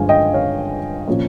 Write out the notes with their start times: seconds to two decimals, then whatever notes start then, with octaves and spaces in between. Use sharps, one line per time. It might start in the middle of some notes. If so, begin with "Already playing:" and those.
Already playing: G1 G2 F3 G#3 F5 G#5
0.09 D#5 G5
0.34 C#5 F5
1.08 A#2 F3 A#3 C#4